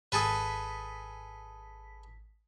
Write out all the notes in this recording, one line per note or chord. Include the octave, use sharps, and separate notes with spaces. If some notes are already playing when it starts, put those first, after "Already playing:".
G#1 G#4 A4 B4 B6